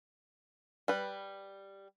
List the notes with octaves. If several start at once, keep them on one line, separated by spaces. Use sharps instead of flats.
G3 B4